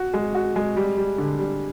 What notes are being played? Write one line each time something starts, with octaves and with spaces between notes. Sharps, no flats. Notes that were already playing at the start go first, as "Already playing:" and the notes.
Already playing: F#4
G#3
F#4
G#3
G3
G3
D3
G3